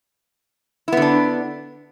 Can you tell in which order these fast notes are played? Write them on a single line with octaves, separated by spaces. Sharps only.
E4 B3 D3 D4